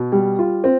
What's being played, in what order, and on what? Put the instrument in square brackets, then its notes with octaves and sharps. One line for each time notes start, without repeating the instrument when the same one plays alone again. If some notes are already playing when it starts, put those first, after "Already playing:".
Already playing: [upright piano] B2
G3
F4
C4